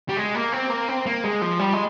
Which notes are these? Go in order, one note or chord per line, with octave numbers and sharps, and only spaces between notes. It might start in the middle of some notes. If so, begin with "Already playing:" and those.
G3
G#3
A#3
C4
A#3
C4
A#3
G#3
F3
G3
G#3